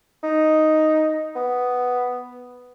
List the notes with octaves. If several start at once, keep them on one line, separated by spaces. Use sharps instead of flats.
D#4
B3